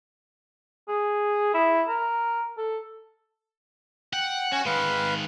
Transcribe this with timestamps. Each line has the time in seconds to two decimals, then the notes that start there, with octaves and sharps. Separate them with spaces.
0.88 G#4
1.54 E4
1.88 A#4
2.58 A4
4.13 F#5 G5
4.52 C#4 F#4 C#5
4.66 D#3 G#3 B4 F5